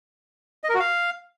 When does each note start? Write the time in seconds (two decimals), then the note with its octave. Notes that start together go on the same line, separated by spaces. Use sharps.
0.64 D#5
0.69 A#4
0.74 F#4
0.80 F5